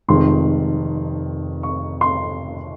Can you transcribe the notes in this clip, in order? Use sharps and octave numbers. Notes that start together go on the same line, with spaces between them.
F1 F2 D#3 G#3 C6
C#6
C6